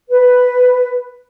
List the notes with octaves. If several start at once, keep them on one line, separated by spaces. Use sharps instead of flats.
B4